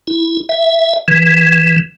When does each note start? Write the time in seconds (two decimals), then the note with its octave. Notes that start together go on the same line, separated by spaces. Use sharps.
0.07 E4
0.49 E5
1.08 E3